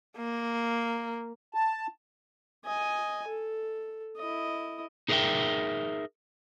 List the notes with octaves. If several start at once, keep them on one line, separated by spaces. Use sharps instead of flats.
A#3
A5
D#5 G#5
A4
E4 D#5
D#4 G#4 A#4 D5 E5 G5